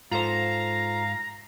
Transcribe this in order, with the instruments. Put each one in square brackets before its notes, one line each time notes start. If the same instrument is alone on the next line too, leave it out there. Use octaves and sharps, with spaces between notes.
[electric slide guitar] G#2 [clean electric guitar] F4 A4 C5 [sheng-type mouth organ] F5 [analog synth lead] A#5